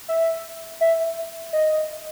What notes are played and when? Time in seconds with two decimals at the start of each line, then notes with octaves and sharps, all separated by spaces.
0.08 E5
0.81 E5
1.53 D#5